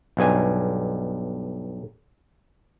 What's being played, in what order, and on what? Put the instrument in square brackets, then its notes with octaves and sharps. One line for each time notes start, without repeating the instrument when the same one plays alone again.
[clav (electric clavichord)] B1 G2 G#5